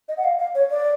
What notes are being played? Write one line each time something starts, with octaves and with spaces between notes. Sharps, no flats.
D#5
F#5
F5
F5
C#5
D5